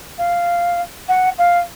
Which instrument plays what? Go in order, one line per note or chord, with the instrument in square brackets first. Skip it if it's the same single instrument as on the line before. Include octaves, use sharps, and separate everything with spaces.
[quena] F5
F#5
F5